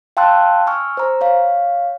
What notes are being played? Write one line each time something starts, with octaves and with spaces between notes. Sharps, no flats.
F5 G5 A5 C6 E6 F#6
G#5 C#6 E6 F6
C5 A#5
C#5 F5